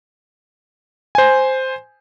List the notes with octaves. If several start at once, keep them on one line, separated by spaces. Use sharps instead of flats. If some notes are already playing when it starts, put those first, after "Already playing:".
C5 G#5